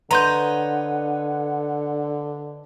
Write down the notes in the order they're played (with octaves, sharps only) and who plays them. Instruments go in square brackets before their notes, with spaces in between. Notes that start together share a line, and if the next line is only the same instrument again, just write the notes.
[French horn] D3 [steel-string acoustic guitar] B4 C#5 D#5 [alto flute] F#5 [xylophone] A#5 C6 G6